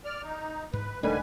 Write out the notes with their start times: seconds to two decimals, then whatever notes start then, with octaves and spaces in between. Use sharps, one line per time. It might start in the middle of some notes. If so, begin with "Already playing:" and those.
0.05 D5 F6
0.23 D#4
0.73 G#2 B4
1.03 D#1 D3 D#3 G3 A3 D4 B4 G#5